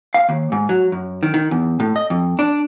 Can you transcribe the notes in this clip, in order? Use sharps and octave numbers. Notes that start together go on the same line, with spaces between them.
F5
D#2
G#2
F#3
F#2
D#3
D#3
E2
A2
D#5
F2
D4